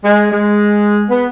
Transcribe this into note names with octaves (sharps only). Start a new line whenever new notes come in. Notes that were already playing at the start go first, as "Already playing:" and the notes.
G#3
G#3
B3